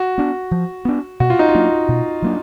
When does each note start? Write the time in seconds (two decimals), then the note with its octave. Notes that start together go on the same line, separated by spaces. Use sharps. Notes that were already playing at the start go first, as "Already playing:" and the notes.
Already playing: F#4
0.18 B3 D4
0.51 F3
0.85 B3 D4
1.20 B2 F#4
1.30 F4
1.39 D#4
1.49 F4
1.55 F#3 A#3 D4
1.88 B2
2.22 F#3 A#3 D4